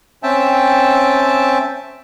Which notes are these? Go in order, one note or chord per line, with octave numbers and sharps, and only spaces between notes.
C4 C#4 E5 G5 A5